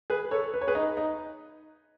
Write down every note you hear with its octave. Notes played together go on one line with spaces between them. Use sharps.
G#4 B4
A4 C#5
B4
C#5
G#4 B4
D#4
D#4